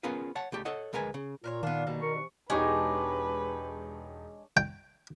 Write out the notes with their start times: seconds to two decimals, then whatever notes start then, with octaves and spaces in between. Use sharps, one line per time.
0.03 B3 C#4 F4 G#4 A#4 B4
0.35 C#5 F#5 A5
0.52 C#2 A3 G4
0.65 A4 C#5 D#5 F#5
0.93 D2 G#3 A#4 B4 G#5
1.14 C#3
1.44 A#2 F4 A#4 B4 C#5
1.63 D#3 B3 D4 F5
1.87 B2 D3 G3 A#3 D#4
2.02 A#4 C#6
2.15 C3 E3
2.50 E1 G#3 D4 D#4 G4 B4 C#5 D5
4.57 G5